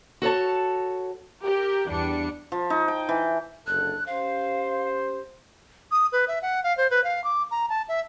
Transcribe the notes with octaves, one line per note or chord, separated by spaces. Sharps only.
F#4 A4 C#5 A5
G4 A#4
E2 G3 D4 C#7
F3
D#4
G5
E3
F#1 D3 A4 F#6
C#4 G4 C5 F5
D#6
B4
E5
F#5
F5
C5
B4
F5
D6
A#5
A5
E5